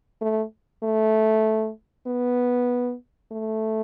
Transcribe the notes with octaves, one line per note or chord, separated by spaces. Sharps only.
A3
A3
B3
A3